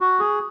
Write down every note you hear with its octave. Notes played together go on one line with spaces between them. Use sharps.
F#4
G#4